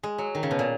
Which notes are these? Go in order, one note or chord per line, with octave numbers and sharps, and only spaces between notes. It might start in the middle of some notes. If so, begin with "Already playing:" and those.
G#3
F#3
D#3
C#3
B2
A#2